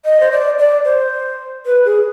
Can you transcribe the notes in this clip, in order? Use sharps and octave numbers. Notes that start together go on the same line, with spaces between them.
D#5
C5
D5
D5
C5
B4
G#4